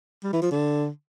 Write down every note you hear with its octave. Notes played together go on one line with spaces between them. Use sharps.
G3
E3
F3
D3